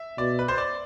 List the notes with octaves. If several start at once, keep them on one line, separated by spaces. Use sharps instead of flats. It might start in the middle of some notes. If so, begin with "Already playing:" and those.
Already playing: E5
B2 D5
B4
C5
D5